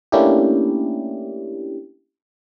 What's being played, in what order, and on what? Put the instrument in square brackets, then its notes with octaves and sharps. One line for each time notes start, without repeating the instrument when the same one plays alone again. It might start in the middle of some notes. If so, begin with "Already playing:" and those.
[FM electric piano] A3 A#3 C#4 D4 E4 G4